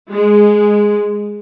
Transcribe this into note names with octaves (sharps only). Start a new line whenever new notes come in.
G#3